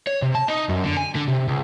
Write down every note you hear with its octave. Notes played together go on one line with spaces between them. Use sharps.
C#5
C3
A5
D#4
F#2
D3
G#5
D3
C3
C#2